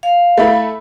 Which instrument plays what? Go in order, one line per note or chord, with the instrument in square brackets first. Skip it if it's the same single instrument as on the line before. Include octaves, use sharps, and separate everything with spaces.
[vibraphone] F5
[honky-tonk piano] A3 E4 B5